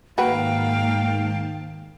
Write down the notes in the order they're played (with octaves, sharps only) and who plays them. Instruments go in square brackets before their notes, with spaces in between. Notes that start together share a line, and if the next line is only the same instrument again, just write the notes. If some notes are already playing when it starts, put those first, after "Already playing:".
[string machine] G#2 D#3 A5 [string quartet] A#3 F5 [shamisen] F#4 B4 [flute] G5